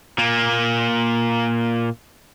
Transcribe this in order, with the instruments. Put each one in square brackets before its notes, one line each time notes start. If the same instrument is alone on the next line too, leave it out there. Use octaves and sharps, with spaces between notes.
[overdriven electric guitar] A#2 A#3